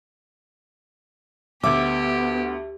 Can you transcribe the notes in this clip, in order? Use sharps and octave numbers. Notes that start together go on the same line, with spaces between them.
D2 B3 G4 E5 D6